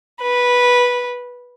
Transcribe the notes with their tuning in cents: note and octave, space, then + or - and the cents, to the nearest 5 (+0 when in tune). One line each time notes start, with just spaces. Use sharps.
B4 -10